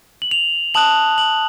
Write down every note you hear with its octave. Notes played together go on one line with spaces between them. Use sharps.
F#7
F7
A5 D#6 F#6 F#7
F#7